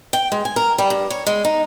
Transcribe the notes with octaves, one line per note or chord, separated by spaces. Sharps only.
G5
G#3
G#5
A#4
G3
G2
C#5
G#3
D#4